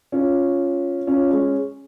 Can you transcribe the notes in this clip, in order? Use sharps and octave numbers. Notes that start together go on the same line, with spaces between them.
C#4 F4
C#4 F4
G#3 C#4